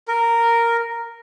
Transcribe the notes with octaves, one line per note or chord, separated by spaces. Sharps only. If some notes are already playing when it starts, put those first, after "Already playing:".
A#4